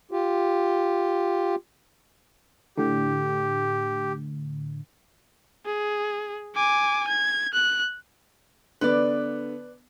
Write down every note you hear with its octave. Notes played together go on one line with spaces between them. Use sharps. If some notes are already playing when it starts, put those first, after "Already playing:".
F4 G4
A2 D3 G4
G#4
G#5 D6
G#6
F#6
D3 B3 B4 D5